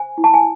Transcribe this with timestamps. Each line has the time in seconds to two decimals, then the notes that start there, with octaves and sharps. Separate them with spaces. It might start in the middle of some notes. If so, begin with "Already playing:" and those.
Already playing: C5 G#5
0.18 E4
0.24 A5
0.34 G#5